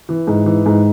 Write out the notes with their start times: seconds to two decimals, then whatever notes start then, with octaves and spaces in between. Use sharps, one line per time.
0.09 E3
0.27 G#2
0.46 E3
0.66 G#2